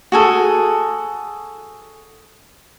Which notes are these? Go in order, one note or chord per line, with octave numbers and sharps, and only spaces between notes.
F#4 G#4 A4